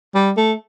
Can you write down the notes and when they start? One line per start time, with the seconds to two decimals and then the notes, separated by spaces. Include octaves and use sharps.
0.15 G3
0.37 A3